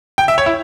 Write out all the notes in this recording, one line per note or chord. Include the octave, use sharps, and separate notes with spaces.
G5
E5
C#5
E4